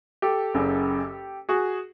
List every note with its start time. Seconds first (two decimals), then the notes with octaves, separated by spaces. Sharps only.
0.22 G4 A4
0.54 F#1 F#2 C#3
1.49 F#4 G#4